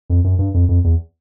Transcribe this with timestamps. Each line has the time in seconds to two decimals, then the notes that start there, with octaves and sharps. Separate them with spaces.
0.10 F2
0.24 F#2
0.39 G2
0.54 F2
0.69 F2
0.84 E2